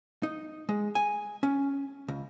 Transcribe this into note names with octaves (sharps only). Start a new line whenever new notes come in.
D#4
G#3
G#5
C#4
C#2